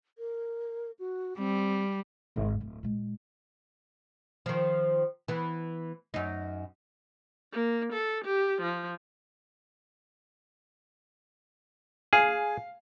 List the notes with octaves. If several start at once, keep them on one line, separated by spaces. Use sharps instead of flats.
A#4
F#4
G3 C4
G#1
D1
A#2 G#3
D#3 F3
E3 B3
F#2 D#4
A#3
A4
G4
F3
G#4 F5 G#5